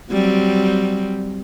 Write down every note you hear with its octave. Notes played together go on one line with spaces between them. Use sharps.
F#3 G3 C4